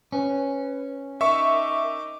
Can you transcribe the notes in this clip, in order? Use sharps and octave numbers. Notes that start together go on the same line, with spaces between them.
C#4 B4
D#4 A#4 E5 C#6 D6